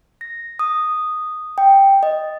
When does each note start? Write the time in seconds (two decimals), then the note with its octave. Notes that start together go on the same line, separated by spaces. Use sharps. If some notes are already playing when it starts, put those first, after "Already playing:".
0.21 A#6
0.59 D#6
1.58 G5
2.03 D#5